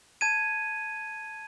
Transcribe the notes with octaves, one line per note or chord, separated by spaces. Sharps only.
A5 G#6 D#7